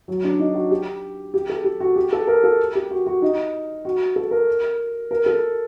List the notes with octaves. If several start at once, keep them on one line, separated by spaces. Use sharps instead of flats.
F#3
D4
D#4
F#4
G4
G4
A4
G4
F#4
G4
A4
A#4
A4
G4
F#4
F#4
D#4
F#4
A4
A#4
A#4
A4